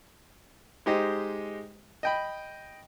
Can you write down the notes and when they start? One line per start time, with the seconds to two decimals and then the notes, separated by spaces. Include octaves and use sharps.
0.86 G#3 D#4 G4 C5 D#5
2.03 D#5 G5 B5